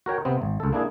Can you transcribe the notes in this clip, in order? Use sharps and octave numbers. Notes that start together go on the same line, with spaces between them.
F#4 A#4 C#5 G5
C3 B3 C4
G#1
C#2 A4
A#3 D4 E4 G#4